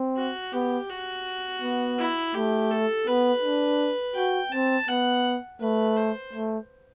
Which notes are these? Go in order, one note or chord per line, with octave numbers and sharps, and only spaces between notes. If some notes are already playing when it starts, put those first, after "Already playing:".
Already playing: C4
F#4
B3 G4
F#4
B3
E4
A3 G4
A4
B3 B4
D4
F#4 G5
C4 A5
B3 F#5
A3 B4
C5
A3